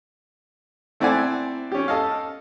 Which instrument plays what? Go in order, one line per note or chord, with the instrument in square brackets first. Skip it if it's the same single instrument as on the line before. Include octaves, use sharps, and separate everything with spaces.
[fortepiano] A3 C4 E4 D5 F#5 G#5
C#4 G4
A4 D#5 F5